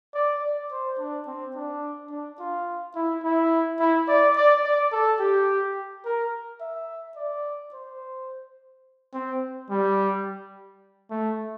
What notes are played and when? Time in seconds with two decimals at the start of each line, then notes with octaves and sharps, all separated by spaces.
0.15 D5
0.43 D5
0.71 C5
0.99 D4
1.27 C4
1.55 D4
2.11 D4
2.39 F4
2.95 E4
3.23 E4
3.80 E4
4.08 D5
4.37 D5
4.64 D5
4.92 A4
5.20 G4
6.05 A#4
6.61 E5
7.17 D5
7.73 C5
9.14 C4
9.70 G3
11.10 A3